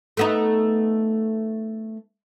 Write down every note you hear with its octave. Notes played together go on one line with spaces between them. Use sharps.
A3 B3 D#4